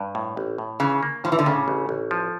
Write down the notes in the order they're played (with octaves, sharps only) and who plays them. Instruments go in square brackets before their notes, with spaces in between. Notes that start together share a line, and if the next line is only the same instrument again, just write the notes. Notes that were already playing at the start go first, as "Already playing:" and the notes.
Already playing: [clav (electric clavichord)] G2
A2
A1
A2
[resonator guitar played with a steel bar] C#3 [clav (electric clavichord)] E3
[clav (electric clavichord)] A#3
[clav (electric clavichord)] A2 [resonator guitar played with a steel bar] F3
[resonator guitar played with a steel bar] E3
D3
[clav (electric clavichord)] A2 [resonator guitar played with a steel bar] C#3
[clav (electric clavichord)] A1
A1
F3